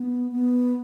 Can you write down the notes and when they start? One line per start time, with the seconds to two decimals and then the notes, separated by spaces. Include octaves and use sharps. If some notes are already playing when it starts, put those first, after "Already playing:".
Already playing: B3
0.32 B3